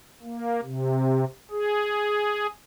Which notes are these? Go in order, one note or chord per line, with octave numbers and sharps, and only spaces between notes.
A#3
C3
G#4